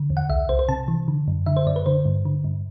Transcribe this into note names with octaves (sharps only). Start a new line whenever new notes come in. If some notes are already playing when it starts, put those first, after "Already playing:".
Already playing: D3
E2
F#5
C2 E5
C2 C5
C5
C3 A5
E3
D3
F#2
D3 E5
C5
F#2 D5
B4
D3 C5
G2
D3
G2